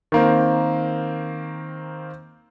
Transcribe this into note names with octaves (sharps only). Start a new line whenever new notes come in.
D#3 A#3 C4